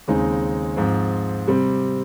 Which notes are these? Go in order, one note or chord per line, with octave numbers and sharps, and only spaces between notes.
D#2 C#3 G#3 C4 D#4
G#2 F3 C4
C3 G3 C4